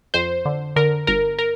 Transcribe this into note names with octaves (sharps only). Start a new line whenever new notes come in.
F2 C5
D3
D3 A#4
G1 A#4
A#4